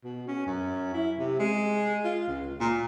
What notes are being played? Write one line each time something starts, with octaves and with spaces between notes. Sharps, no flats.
B2
C#4
F#2
E4
C3
G#3
F4
C#2
A#2